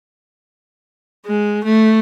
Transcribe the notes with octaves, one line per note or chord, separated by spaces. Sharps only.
G#3
A3